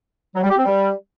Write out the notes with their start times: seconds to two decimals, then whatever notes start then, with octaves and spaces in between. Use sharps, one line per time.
0.35 F#3
0.43 G3
0.50 G4
0.58 C4
0.65 G3